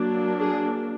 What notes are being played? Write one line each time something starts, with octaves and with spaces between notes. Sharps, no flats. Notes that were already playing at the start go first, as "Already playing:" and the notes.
Already playing: F#3 A#3 D4
G#4